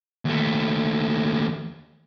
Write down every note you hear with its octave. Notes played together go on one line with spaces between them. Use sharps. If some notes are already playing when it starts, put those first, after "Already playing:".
D#2 A3